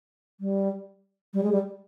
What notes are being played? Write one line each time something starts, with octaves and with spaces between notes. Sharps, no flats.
G3
G3
G#3
G3